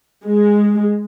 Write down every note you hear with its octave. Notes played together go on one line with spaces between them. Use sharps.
G#3